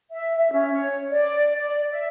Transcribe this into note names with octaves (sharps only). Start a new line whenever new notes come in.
E5
E5
C#4
C#5
D5
D5
E5